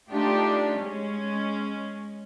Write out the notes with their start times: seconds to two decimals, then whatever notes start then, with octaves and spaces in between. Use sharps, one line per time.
0.12 A3 D4 D#4 F4 G4
0.78 G#3 C#4